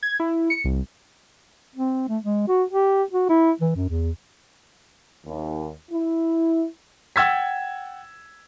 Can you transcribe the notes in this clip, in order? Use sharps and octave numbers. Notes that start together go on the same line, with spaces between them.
G#6
E4
C#7
C2
C4
A3
G#3
F#4
G4
F#4
E4
E3
F#2
E2
D#2
E4
F#5 G5 E6 G#6 A6 B6